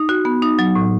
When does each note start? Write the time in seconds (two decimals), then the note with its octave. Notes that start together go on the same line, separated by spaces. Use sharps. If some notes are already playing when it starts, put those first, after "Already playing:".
Already playing: D#4
0.09 F#4
0.25 B3
0.42 D#4
0.59 F#3
0.75 A2